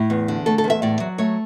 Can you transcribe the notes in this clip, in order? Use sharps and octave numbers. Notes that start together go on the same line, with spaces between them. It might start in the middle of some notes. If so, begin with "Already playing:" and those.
Already playing: A2 E4
E2
D3
A3 A4
A4
E2
E5
A2 D5
F#3
A3 C#5